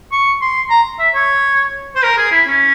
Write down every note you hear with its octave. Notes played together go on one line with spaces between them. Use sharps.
C#6
C6
A#5
E5
C#5
C5
A#4
G#4
E4
C#4